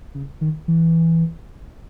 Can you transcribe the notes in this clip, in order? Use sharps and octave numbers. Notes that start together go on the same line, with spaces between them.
C#3
D#3
E3